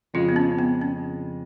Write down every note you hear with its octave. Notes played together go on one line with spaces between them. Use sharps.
F2 C#3 G#3 F4
B3
C#4
B3
C#4